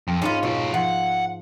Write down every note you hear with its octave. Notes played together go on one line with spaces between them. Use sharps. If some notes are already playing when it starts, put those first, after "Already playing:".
F2
G#2 B3 C#4 F4
B2 F4 C#5
F3 F#5